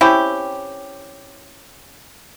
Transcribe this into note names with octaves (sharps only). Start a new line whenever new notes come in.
C4 C#4 E4 G4